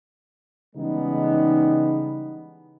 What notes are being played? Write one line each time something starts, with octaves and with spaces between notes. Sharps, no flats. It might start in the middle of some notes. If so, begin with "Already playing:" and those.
C#3 E3 G3 G#3 B3 D#4